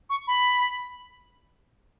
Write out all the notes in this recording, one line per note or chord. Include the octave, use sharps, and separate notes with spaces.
C#6
B5